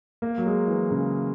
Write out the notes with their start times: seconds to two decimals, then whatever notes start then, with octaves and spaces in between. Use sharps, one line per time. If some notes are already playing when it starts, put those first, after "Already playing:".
0.22 A#3
0.38 F#3
0.46 G#3
0.68 E3
0.91 C#3